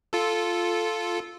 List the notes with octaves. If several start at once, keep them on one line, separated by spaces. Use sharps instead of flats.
F4 A4